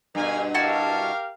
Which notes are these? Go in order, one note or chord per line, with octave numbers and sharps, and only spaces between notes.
G2 B2 A#4 F5 G#5
E4 F#4 G4 A#4 F5 A5